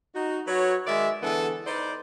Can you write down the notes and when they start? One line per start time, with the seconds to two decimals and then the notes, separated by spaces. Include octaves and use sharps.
0.15 D#4 F#4
0.47 F#3 F#4 B4 C#5
0.87 D#3 G#3 D5 E5
1.23 D3 E3 B3 G#4 A4
1.67 D#4 B4 C5 D5